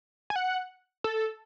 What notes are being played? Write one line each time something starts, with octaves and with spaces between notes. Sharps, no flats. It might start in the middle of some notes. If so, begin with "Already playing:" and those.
G#5
F#5
A4